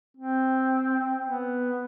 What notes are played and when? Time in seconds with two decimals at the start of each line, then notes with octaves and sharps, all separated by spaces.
0.17 C4
1.27 B3